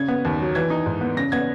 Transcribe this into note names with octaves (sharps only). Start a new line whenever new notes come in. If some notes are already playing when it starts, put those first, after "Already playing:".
Already playing: C#3 G#6
B3
D#2
F#3
E3 G#6
D#4
G#2
B3
C#3 A#6
B3 G#6